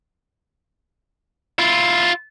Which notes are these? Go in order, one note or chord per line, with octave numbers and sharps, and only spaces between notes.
E4 F4